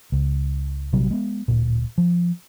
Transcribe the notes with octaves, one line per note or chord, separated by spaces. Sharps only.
C#2
A#1 C3 F#3 G3
G#3 B3
D1 A#2
F3